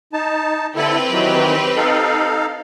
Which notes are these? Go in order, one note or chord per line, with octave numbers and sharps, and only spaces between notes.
D#4 A5
D3 C4 E4 G4 A4 B4
D#3 E3 F#3
D#4 A4 F5